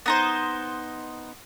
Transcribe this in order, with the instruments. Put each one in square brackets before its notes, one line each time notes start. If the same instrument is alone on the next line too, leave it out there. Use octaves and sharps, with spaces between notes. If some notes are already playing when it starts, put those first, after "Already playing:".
[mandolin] B3 D#4 C5